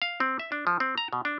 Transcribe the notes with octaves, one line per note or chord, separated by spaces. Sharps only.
F5
C4
E5
D4
F3
C4
A#5
B2
D4